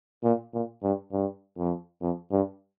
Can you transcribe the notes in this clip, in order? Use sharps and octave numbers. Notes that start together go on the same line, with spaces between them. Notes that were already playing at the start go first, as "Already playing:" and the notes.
A#2
A#2
G2
G2
F2
F2
G2